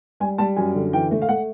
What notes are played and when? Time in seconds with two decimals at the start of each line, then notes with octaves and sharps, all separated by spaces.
0.20 G3 G#5
0.38 G3 A5
0.57 F#2 G#5
0.75 D3
0.93 E3 G5
1.11 A3
1.22 F5
1.29 A3 F#5